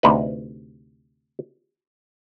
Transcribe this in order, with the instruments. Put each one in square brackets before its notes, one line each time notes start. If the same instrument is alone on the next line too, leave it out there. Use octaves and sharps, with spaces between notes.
[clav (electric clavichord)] D2 C3 D#4 B4